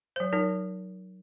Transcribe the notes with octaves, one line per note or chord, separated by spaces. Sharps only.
F#3 C5
F#3 D#4 A#4